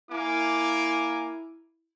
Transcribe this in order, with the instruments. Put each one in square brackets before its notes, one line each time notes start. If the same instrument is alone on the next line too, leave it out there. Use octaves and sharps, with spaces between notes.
[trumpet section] A#3 G#5 D6 [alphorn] E4